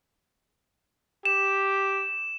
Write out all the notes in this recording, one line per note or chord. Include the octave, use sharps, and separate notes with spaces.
G4 E7